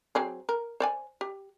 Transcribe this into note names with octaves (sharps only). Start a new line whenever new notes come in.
F#3 C4 G#4
A#4
C5 D5 G#5
G4